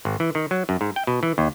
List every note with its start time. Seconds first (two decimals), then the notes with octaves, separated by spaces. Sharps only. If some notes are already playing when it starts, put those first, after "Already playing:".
0.05 G#1
0.20 E3
0.35 D#3
0.51 F#3
0.69 F#2
0.81 G#2
0.96 G5
1.07 B2
1.23 E3
1.38 D#2